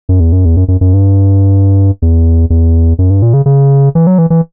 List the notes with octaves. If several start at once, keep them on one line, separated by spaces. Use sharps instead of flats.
F#2
E2
F#2
E2
F#2
F#2
F#2
G2
E2
E2
F#2
G2
A#2
C#3
C#3
E3
F#3
E3
E3